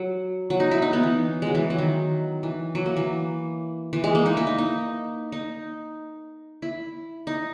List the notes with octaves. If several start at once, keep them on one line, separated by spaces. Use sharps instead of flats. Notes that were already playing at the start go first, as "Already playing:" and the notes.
Already playing: F#3
F#3
D#4
E4
D#4
B3
E3
F#3 G#3
E3
F#3
D#3
E3
F#3
A#3
E3
E3
G#3
A#3
D#4
E4
D#4
D#4
D#4
E4
D#4